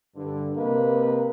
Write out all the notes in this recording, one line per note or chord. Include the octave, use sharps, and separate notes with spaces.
G2 D3
C3 A#3 B4 D#5